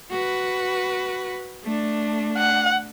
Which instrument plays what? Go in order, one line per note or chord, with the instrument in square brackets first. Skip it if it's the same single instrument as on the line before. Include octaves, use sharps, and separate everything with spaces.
[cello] F#4 B4
A3 D4
[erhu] F#5